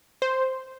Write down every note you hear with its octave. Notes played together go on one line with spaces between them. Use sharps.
C5